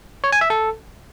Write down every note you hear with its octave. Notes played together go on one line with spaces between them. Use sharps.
C#5
G#5
E5
A4